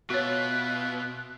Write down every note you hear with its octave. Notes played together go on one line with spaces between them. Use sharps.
B2 F4 F#4 C#5 E5 F#6